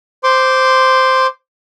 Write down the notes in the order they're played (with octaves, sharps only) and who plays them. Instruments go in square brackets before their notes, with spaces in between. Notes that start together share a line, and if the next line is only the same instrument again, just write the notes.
[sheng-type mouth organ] C5 C6 D6